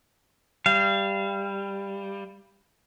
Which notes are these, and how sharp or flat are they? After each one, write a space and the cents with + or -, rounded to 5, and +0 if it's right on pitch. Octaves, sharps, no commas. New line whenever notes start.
G3 +10 F5 -25